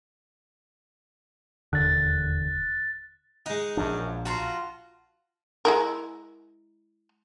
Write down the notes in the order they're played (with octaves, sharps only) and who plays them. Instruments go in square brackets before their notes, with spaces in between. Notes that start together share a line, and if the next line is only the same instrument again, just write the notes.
[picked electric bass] E1 D#2 D3 [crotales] F#6 A6
[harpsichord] G#3 D#4 [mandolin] F#5
[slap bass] A#1 F3 D4 [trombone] F#2
[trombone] F4 [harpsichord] F#4 [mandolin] A5 A#5 C6
[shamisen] G#3 E4 A#4